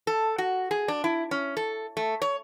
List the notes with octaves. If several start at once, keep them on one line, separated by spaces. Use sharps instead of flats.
A4
F#4
G#4
D4
E4
C#4
A4
A3
C#5